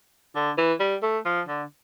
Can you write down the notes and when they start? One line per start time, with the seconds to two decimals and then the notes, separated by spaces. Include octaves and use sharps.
0.36 D3
0.58 E3
0.80 G3
1.03 A3
1.25 F3
1.48 D3